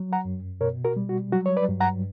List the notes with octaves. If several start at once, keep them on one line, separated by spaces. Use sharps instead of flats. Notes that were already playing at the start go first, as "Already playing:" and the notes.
Already playing: F#3
F#5 A#5
F#2
B2 A#4 C#5
F#4 A#4
G3
F#4
F#3 F#4
C#5
B4 D5
G2
F#5 A#5